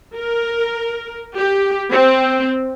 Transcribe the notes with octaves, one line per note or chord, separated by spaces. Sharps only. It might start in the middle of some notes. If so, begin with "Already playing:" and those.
A#4
G4
C4